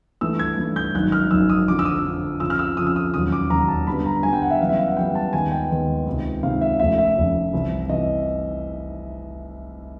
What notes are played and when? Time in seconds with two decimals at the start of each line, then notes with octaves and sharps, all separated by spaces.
0.21 G2 E3 A3 E6
0.39 G#6
0.57 G2 E3 A3
0.76 G6
0.94 G#1 F#2 D#3 F#6
1.12 F6
1.31 G#1 F#2 D#3 E6
1.49 D#6
1.68 F2 D3 F3 D6
1.79 E6
1.85 D#6
2.05 F2 D3 F3
2.40 F2 C#3 F3 E6
2.50 F6
2.59 E6
2.77 F2 C#3 F3 D#6
2.87 E6
2.96 D#6
3.14 E1 D#2 C#3 F#3 D#6
3.32 D6
3.50 E1 D#2 C#3 F#3 A#5
3.68 A5
3.87 G2 D3 G3 B3 B5
4.06 A#5
4.23 G2 D3 G3 B3 G#5
4.33 G5
4.42 F#5
4.51 E5
4.60 F#2 C#3 E3 G3 B3 F5
4.69 E5
4.79 F5
4.88 F#5
4.97 F#2 C#3 E3 G3 B3 G5
5.15 A5
5.33 D#2 D#3 G#3 B3 G#5
5.52 G5
5.70 D#2 D#3 G#3 B3
6.06 C#2 C3 D#3
6.43 C#2 C3 D#3 F5
6.61 E5
6.80 F1 F2 C#3 E5
6.98 E5
7.16 F1 F2 C#3
7.52 C2 C3 E3
7.89 C3 E3 D#5